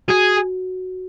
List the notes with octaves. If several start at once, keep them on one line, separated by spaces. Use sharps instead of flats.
F#4 G#4